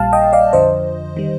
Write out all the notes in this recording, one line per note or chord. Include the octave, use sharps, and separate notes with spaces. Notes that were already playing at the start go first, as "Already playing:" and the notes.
Already playing: A#1 A#2 G3 F5 A5
D#5 G5
D5 F5
F2 D3 F3 C5 D#5
D#3 G3